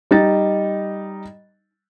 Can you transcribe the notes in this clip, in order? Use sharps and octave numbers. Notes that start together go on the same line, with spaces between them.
G3 D#4 A6